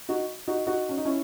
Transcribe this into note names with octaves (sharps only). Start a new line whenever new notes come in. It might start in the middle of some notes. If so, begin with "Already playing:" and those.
D#4 F#4
D#4 F#4
D#4 F#4
C#4
D#4
C#4 E4